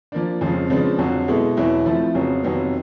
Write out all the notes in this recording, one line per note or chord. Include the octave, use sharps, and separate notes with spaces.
F3 A#3 D4
F2 C#3 F3 G#3
C#3 F3 G#3 B3 D4
F2 D3 F#3
B2 G#3 B3 E4 A4
E2 B2 F#3 B3 E4
F3 A3 C4 E4
F2 C#3 F#3 B3
F2 C3 D#3 F#3 B3